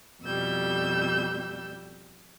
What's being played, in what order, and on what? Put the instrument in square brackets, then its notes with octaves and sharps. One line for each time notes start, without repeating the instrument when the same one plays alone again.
[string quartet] F2 B2 G3 E6 G6